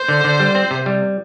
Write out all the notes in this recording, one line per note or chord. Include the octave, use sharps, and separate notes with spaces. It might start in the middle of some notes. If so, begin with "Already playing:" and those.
Already playing: C5
D3
D3
G3
C4
C3
G3